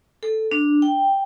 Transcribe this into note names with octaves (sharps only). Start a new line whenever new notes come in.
A4
D4
G5